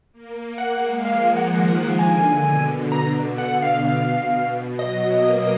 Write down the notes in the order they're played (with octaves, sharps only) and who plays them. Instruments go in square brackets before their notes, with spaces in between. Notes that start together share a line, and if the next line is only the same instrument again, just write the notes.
[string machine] A#3
A#3
[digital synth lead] F#5
[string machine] G#3
[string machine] F3 [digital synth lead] F5
[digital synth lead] F#5
[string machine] D#3
[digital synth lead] F#5
[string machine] D3 [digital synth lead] G#5
[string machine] B2
[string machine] B2 [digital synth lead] A#5
[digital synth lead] F#5
F5
F5
[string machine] F#3 [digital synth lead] D#5
[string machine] A#3